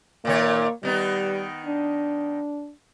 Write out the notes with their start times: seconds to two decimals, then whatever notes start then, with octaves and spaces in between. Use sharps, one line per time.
0.25 A#2 D#3 A#3 C#5
0.83 D#3 G3 B3 D#4
1.66 D4